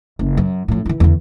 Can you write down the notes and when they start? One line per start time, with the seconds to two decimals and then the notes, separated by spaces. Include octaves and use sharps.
0.19 F#1
0.37 F#2
0.68 A2 F3
0.86 E3 E4
1.00 E2 D3